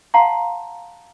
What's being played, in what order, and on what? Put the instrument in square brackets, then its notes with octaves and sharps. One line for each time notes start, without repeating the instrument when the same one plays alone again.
[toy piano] F5 F#5 A5 A#5 C6